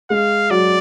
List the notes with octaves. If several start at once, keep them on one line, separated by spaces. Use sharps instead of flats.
G#3 F5
F#3 D5